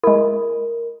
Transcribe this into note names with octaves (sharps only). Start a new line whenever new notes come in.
G#3 E4 A#4